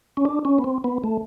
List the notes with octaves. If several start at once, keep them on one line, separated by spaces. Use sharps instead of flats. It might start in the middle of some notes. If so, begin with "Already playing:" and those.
C#4
D4
C#4
B3
C4
B3
A3